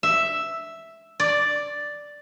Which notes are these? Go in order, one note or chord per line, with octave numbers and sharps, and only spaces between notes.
E5
D5